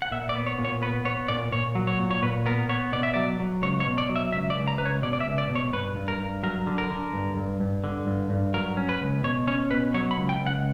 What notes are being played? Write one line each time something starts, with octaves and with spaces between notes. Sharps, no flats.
F#5
A#2 E5
D5
B3
C#5
A#2
C#5
B3 B4
B3 C#5
A#2 D5
A#2 C#5
F#3
C#5
A#2
C#5
A#2 B4
B3 A#4
B3 C#5
B2 D5
E5
F#3 D5
F#3
C#2 C#5
C#5
B2
D5
F#3
E5
C#2 E5
D5
C#2
A#5
C#2 B4
C#5
B2 D5
D5
E5
C#2
D5
B2
C#5
G2 B4
G2
A#4
G2
F#3 A#4
D3
A#4
D3
G2
G2
G2
D3
G2
G2
F#3 A#4
C#4
B4
C#2
B2 C#5
C#4 C#5
B2 B4
F#3 C#5
B5
C#2
G5
C#2
F#5